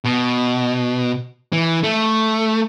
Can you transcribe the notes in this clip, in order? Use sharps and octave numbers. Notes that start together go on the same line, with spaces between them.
B2
E3
A3